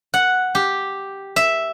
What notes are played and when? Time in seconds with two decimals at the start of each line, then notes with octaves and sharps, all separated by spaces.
0.14 F#5
0.55 G4
1.36 E5